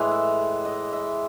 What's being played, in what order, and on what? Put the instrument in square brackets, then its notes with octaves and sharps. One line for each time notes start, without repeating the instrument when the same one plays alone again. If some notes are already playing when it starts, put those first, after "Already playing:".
Already playing: [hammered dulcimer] A2 E3 G#3
E5
D#5
E5